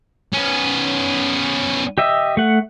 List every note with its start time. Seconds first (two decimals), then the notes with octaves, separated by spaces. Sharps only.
0.33 B3 C#4
1.98 G4 D#5 E5
2.37 A3 F#5